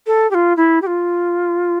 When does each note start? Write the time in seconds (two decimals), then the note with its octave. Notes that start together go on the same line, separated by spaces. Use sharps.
0.06 A4
0.31 G4
0.34 F4
0.57 E4
0.82 G4
0.87 F4